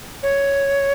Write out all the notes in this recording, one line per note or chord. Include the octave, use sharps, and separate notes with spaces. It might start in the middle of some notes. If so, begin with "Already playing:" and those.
C#5